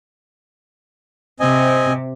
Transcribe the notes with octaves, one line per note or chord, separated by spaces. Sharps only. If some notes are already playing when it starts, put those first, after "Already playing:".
C3 C4 D#5 G#5